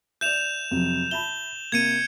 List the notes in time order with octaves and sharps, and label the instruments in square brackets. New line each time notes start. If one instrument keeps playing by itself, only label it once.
[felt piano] D5 E5 [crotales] G6 E7 F7
[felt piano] F2 C3 F#3
[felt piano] E5 A5 B5 [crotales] G7
[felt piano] C3 A#3 [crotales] G#6 C#7 D#7